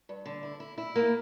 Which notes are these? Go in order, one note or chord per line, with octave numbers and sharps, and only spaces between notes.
G2
D3
E4
E4
E4
A#3